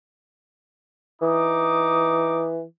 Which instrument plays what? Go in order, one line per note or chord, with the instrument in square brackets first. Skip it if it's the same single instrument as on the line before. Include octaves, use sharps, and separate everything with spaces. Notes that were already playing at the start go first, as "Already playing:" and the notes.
[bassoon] E3 [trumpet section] D#4 D6 D#6